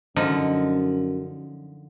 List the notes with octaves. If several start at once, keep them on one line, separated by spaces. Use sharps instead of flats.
F#2 D3 F3 D#4